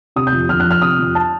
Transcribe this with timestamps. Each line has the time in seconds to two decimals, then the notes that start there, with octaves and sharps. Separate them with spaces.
0.16 C3 D#6
0.27 G6
0.33 F2
0.49 F2 F6
0.60 F#6
0.66 F3
0.71 F6
0.82 C3 D#6
0.99 F2
1.15 A5